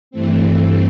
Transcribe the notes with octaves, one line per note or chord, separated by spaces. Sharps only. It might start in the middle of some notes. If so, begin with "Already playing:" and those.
G2 E3 A3 C4